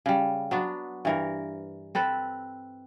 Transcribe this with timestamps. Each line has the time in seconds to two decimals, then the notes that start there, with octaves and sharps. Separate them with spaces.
0.06 C#3 G3
0.51 F#3 B3 D4
1.05 G2 E3 A#4
1.95 C4 A4 B4